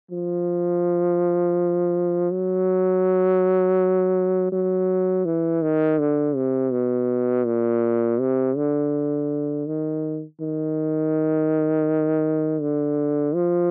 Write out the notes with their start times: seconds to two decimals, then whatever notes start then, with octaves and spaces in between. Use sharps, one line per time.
0.11 F3
2.31 F#3
4.52 F#3
5.25 E3
5.62 D#3
5.99 D3
6.36 C3
6.72 B2
7.46 A#2
8.20 C3
8.57 D3
9.67 D#3
10.40 D#3
12.61 D3
13.35 F3